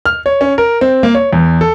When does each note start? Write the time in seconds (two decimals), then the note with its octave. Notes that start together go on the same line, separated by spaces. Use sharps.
0.06 F6
0.26 C#5
0.41 C#4
0.58 A#4
0.81 C4
1.03 A#3
1.15 C#5
1.33 E2
1.61 A4